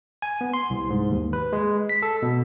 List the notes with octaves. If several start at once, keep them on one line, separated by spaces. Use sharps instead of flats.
G#5
B3
C6
C2
G#2
D#2
B4
G#3
B6
A4
B2